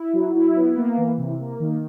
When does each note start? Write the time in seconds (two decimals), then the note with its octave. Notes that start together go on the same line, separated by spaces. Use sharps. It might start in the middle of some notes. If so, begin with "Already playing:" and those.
Already playing: E4
0.13 F#3
0.35 E4
0.56 B3
0.76 A#3
0.98 E3
1.18 C3
1.40 A#3
1.60 D#3